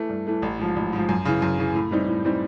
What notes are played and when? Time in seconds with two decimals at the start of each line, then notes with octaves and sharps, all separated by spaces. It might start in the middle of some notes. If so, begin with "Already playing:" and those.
Already playing: E3 A3
0.09 G2
0.27 E3 A3
0.42 A1
0.59 G#2 F3
0.76 A1
0.93 G#2 F3
1.09 F#2
1.25 C#3 E3
1.42 F#2
1.58 C#3 E3
1.74 A2
1.91 E3 G3 C4 D#4
2.08 A2
2.24 E3 G3 C4 D#4